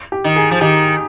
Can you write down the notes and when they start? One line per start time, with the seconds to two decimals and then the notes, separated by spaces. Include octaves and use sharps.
0.12 G4
0.24 D#3
0.36 G#4
0.51 F3
0.61 D#3 G4